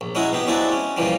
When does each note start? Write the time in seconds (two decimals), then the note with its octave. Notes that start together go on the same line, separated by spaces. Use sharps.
0.01 A#1
0.15 F#3 G#3 C#4 E4 F#4
0.32 B2 B3 G4
0.47 F#3 G#3 C4 D4 E4 F#4
0.72 C#4
0.97 A#2 C#3 E3 F3 G3